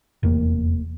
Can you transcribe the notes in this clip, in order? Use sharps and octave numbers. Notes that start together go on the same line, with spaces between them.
F1 E2 A#3